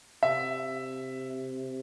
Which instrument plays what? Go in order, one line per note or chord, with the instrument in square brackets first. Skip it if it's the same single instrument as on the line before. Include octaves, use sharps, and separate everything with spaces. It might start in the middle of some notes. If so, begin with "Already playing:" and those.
[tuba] C3 [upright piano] E5